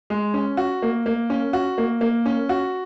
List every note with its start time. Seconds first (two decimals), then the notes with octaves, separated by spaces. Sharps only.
0.10 G#3
0.34 C#4
0.57 F#4
0.82 A#3
1.06 A#3
1.30 C#4
1.53 F#4
1.78 A#3
2.01 A#3
2.26 C#4
2.49 F#4